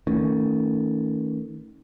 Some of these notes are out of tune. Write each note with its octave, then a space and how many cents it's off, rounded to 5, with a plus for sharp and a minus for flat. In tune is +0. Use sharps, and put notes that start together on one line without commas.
D#3 +35 A3 +25 C#4 +0